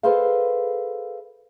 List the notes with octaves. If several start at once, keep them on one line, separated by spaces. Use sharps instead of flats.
G#4 A4 B4 C5 D#5 F5